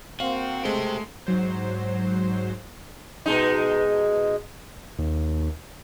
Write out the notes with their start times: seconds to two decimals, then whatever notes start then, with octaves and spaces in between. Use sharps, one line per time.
0.20 A#3 C4 F#4 F5
0.65 G#3 A3 G4 C5
1.27 G#2 F#3 C5
3.26 B2 G#3 D#4
4.99 D#2